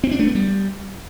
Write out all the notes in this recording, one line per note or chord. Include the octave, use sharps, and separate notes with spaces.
C4
D4
A3
B3
G3